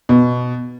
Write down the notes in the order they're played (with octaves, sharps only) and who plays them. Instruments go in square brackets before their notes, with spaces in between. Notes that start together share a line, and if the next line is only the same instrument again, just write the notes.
[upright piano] B2